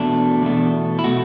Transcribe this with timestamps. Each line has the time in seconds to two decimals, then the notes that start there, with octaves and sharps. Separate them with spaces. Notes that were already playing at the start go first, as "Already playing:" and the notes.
Already playing: E2 B2 A3 D4
0.42 E2 B2 A3
0.99 E4
1.04 B2 A3 F#4